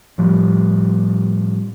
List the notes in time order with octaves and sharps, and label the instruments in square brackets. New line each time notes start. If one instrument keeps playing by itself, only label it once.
[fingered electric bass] A2 F3 G3